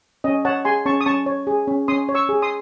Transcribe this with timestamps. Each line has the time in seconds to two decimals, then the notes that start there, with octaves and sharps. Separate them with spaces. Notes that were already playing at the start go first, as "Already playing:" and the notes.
0.24 C#4 D#5
0.45 C#5 F#5 A5
0.65 G#4 G#5 C6
0.86 C#4 A5 C#6
1.01 D#6
1.06 C#4 A5 C#6
1.26 C#5
1.47 G#4
1.68 C#4
1.88 C#4 C6 D#6
2.09 C#5
2.15 C#6 E6
2.29 G#4
2.42 C6 D#6